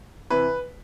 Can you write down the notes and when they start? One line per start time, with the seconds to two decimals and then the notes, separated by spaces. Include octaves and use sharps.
0.30 C3 E3 B4